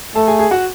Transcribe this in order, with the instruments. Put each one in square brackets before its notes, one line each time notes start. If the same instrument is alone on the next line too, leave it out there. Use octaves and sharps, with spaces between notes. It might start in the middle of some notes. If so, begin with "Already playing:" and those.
[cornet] A3 [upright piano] A4 A5
[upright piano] G#4 G#5
G#4 G#5
F#4 F#5